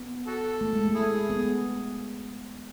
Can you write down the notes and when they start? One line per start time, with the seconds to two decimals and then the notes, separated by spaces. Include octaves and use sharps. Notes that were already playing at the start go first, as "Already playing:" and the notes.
Already playing: B3
0.27 F#4 A4
0.61 A3
0.73 G#3
0.85 A3
0.95 E4 G#4
1.30 B3